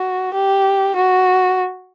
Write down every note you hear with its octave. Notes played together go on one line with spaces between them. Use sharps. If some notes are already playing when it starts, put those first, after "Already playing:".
Already playing: F#4
G4
F#4